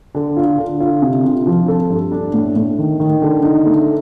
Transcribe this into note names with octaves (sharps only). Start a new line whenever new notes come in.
D3
F4
D3
F4
C3
C3
F3
A4
G2
D4
A2
A2
D#3
D#3
D3
D#4
A3